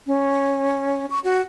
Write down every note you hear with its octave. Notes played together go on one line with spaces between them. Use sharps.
C#4
C#6
F#4